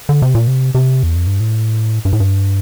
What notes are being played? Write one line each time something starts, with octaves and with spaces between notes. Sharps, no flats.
D3
C3
A#2
C3
C3
E2
F2
G2
A2
G2
A2
G2